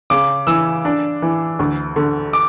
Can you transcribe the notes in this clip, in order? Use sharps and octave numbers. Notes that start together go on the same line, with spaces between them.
C#3 D6
E3 E6
D4
E3
D2
D3
D6